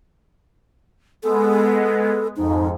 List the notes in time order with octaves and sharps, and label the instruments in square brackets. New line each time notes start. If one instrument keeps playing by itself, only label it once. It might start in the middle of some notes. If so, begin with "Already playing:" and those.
[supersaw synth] G#3 B3 [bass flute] A4
[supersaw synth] F2 G#2 [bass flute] D#4